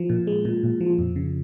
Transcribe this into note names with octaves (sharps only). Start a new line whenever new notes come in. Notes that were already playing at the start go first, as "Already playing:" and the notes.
Already playing: F3
A#2
G#3
A#2
A#2
F3
F2
C#3